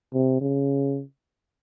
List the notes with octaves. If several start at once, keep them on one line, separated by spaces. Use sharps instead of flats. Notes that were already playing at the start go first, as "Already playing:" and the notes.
C3
C#3